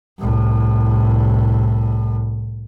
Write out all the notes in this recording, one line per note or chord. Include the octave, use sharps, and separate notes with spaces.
C2 A2